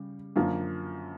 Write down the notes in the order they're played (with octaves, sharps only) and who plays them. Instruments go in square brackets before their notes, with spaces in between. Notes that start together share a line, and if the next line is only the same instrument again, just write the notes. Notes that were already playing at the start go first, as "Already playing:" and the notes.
Already playing: [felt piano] C#3 G3
F#2 D3 F3 A#3